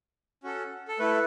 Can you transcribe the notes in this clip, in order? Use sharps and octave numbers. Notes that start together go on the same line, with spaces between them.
C#4 F#4 A4
A4
A3 E4 A4 B4